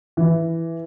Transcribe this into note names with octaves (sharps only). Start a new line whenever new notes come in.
E3